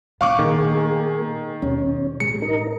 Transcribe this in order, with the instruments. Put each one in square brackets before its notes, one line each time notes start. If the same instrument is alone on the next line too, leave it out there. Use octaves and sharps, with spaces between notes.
[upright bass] D2 A2 [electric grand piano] F5 C#6 D6 [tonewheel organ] F#5
[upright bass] A#2 [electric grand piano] D#3 [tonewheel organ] A#3 G#4
[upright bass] D#2 B2 [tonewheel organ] C#4
[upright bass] A1 [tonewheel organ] G#3 [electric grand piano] C#7
[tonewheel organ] D#4 A#4